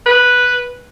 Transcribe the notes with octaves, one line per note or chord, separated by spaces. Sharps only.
B4